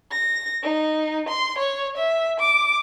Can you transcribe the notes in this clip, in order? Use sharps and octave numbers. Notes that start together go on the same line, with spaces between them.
A#6
D#4
C6
C#5
E5
D6